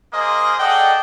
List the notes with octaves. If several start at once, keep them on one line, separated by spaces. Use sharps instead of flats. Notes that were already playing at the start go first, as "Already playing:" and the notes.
A#3 G#4 C5 D#5 D#6
G#4 A4 D5 D#5 F#5 G5